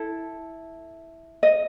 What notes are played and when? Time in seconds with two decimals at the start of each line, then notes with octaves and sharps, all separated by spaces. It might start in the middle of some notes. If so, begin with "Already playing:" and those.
Already playing: E4 A4
1.43 D#5